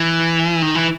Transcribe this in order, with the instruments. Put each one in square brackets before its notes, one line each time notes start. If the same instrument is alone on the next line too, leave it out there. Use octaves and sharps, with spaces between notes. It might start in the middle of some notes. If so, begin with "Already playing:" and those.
Already playing: [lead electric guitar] E3
D#3
E3